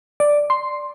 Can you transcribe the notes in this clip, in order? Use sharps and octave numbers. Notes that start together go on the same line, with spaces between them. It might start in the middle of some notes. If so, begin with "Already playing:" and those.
D5
C6